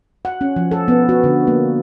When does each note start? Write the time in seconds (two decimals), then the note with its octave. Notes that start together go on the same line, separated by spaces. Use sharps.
0.25 F#5
0.41 C#4
0.56 F3
0.71 A4
0.88 B3
1.09 F#4
1.24 D3
1.47 A#3